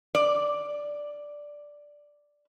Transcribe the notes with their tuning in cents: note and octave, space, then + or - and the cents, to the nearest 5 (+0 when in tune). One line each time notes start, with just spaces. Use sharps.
D5 +0